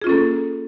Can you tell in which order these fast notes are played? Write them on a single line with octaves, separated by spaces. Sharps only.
G#4 F4 C#4 A4 A#3